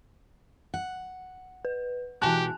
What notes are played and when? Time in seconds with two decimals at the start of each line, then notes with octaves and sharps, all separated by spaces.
0.74 F#5
1.65 B4
2.22 G#2 B2 E3 G4 G#5 A5 F#6